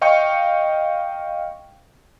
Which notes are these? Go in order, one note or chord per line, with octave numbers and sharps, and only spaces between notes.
D#5 F5 G5 C#6 C#7